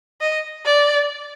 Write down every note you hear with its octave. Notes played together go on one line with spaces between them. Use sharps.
D#5
D5